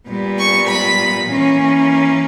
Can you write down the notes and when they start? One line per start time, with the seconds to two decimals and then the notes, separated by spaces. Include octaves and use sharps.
0.09 A#2 G3 B3
0.39 C#6
0.69 B5
1.28 E3 A#3 C#4